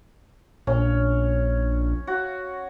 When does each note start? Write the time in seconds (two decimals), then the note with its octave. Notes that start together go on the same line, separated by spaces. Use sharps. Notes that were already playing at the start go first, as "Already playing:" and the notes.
0.67 A#1 C#4
2.07 F#4